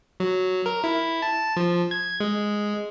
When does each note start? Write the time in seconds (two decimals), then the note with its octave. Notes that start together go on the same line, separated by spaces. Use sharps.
0.20 F#3
0.66 A#4
0.84 E4
1.22 A5
1.56 F3
1.91 G#6
2.20 G#3